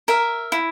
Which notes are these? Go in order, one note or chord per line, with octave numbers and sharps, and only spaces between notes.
A#4 E5
E4